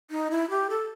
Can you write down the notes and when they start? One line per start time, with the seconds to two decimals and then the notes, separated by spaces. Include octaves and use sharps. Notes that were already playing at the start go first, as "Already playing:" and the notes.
0.11 D#4
0.31 E4
0.50 G4
0.70 A4